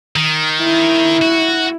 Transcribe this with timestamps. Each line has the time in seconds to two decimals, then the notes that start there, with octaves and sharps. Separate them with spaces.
0.16 D#3
0.61 E4
1.22 F#4